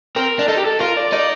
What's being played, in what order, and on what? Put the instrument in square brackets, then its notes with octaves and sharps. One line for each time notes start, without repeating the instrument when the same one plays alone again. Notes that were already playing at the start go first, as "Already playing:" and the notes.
[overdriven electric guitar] C4 [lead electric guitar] A#4
[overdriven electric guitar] D4
[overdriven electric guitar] D#4 [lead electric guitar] A4
[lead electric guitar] G4
A4
[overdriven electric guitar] F4 [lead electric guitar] A#4
[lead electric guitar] D5
[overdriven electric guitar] D#4 [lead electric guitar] D5